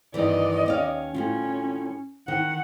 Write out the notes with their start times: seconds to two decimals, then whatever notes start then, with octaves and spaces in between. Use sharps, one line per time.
0.14 G2 D#3 E3 D5 D#5
0.66 D#2 C#4 F5
1.14 A2 G3 C#4 F4
2.28 D#3 F#5